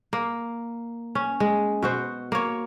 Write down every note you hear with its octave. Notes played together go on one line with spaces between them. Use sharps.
A#3
C#4
G#3
B2 F#4 C5
A#3 C#5